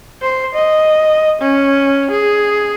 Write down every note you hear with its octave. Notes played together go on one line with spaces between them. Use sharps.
C5
D#5
C#4
G#4